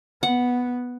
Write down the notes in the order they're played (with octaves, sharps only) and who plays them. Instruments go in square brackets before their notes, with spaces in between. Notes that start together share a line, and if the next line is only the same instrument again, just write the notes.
[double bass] B3 [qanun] F#5